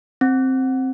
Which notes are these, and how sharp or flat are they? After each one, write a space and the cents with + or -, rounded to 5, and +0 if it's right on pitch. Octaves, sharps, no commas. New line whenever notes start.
C4 +5